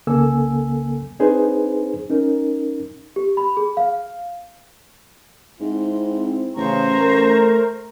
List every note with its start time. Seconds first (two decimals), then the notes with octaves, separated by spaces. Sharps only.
0.07 C2 C#3 A#3 A4 G#5 E6
1.19 C4 D4 D#4 G#4 B4 C5
2.10 C#4 D#4 A#4
3.16 G4
3.37 B5
3.57 G#4
3.77 F5
5.60 G#2 C4 E4
6.56 A1 C#3 C5 A#5 C#6
6.99 A3 A#4